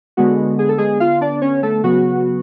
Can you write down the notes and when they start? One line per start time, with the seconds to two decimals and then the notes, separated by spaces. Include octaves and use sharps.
0.17 D3 G#3 B3 F#4
0.59 G#4
0.69 A4
0.78 G#3 G#4
1.00 F4 F5
1.21 D4 D5
1.42 C#4 C#5
1.63 A3 A4
1.84 C#3 F#3 B3 F#4